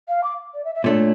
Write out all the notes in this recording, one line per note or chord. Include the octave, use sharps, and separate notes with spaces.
F5
D6
D5
E5
E5
A#2 A3 D4 C#5